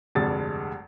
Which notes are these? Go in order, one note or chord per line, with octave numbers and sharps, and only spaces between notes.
F1 D2 G2 G3 G#3 A6